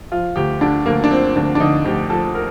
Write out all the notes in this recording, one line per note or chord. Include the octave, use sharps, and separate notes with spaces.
F3 F4
D2 G4
D3 D4
D2 A#3
D4
F3 C4
D2 D4
D4
D3 D#4
D2 G4
F3 A4
A#4